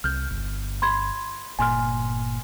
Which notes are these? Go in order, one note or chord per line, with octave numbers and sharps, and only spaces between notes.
C2 F6 G6
G1
B5 C6 G#6
G1 A#2 G#5 C6 F6